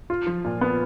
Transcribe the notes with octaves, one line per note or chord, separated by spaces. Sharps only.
F4
F3
A#2
B3